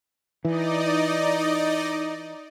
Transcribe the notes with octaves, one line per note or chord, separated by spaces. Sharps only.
E3 D#4 D5 D#5